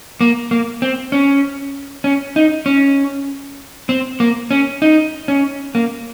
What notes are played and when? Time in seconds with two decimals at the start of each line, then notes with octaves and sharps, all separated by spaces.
0.21 A#3
0.51 A#3
0.82 C4
1.12 C#4
2.04 C#4
2.36 D#4
2.66 C#4
3.89 C4
4.20 A#3
4.51 C#4
4.82 D#4
5.28 C#4
5.75 A#3